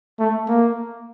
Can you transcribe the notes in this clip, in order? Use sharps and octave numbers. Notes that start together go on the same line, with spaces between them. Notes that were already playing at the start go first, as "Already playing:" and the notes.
A3
A#3